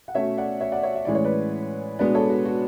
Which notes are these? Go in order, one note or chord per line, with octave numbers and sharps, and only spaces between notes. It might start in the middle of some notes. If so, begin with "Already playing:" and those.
F#5
B2 A3 C#4 C#5 E5
D5 F#5
C#5 E5
D5 F#5
C#5 E5
E5
A2 E3 G#3 C#4 D5
C#5
B4 D5
B2 G#3 B3 D4 B4 D5
A4 C#5
F#4
F#4